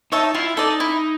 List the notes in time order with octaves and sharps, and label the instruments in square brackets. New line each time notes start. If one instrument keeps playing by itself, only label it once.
[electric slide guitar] D#4 [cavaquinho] C#5 E5 A5
[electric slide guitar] E4 [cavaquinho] F4
[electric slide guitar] D#4 [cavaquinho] A4 D5
[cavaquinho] E4